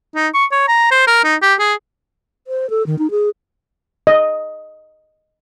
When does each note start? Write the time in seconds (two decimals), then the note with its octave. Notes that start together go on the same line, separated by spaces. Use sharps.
0.15 D#4
0.34 C#6
0.52 C#5
0.68 A#5
0.91 C5
1.07 A#4
1.24 D#4
1.42 G4
1.59 G#4
2.47 C5
2.70 A4
2.87 D#3
2.99 D#4
3.11 G#4
4.07 D#5